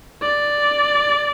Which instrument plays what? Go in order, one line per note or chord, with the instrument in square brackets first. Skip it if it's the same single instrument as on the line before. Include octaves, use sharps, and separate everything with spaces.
[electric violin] D5